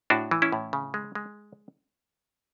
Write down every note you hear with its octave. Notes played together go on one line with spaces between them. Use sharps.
A2 D4 F#4
E3
C#4 E4
A2
C#3
G#3
G#3